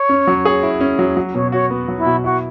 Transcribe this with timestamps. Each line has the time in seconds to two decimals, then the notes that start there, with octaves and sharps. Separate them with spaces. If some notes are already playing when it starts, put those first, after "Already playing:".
Already playing: C#5
0.09 C#4
0.27 F#3
0.45 G#4
0.63 E4
0.81 C#4
0.99 F#3
1.17 F#3
1.35 B2 C#5
1.52 F#4 C#5
1.70 B3
1.88 F#3
1.97 E4
2.06 B2
2.24 E4 F#4